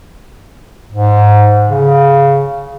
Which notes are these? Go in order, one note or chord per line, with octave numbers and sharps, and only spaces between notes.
G#2
C#3